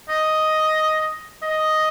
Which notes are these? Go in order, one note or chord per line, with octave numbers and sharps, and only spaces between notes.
D#5
D#5